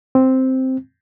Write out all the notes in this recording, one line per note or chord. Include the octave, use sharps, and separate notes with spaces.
C4